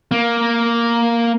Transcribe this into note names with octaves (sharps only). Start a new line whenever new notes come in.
A#3